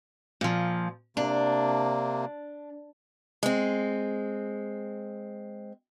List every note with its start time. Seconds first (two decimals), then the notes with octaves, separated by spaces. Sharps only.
0.41 A#2 F3
1.17 C3 A#3 D4
3.43 G#3 C4